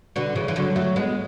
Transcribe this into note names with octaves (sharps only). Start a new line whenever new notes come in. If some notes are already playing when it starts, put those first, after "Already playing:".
B2 D3
C#3 E3
E3
D3 F#3
F#3 A3
G#3 B3